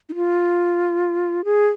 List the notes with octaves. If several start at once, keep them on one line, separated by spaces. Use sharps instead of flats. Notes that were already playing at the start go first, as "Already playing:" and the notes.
D#4
F4
G#4